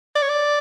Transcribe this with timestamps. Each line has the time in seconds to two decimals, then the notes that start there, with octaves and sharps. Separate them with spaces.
0.15 D5
0.22 C#5
0.29 D5